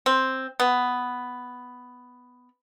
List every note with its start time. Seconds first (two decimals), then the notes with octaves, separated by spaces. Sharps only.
0.06 C4
0.60 B3